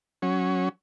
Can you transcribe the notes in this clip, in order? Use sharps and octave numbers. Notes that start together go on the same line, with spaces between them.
F#3 C#4